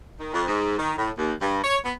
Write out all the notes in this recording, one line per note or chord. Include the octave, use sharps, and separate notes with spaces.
D#3
F2
G#2
D#3
A2
D#2
G2
C#5
B3